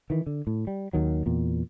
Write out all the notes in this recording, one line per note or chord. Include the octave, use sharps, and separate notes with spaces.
D#3 E3
D3
A2
G3
D#2 D#3 F#3
E2 A#2